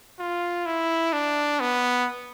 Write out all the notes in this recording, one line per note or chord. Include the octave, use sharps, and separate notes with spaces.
F4
E4
D4
B3